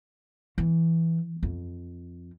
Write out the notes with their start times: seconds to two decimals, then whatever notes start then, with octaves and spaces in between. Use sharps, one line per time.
0.58 E3
1.43 F2